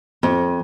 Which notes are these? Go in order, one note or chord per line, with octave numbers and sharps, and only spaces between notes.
F2